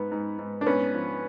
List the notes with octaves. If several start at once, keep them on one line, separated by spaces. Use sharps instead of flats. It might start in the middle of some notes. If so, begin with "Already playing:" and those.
Already playing: G#2 B3
G#2
G#2
D4
G#2 B3 C#4
F3